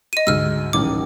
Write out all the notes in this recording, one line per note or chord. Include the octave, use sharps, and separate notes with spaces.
D#5 D#7
D2 G#2 E6 F6
D#1 A1 D#3 D6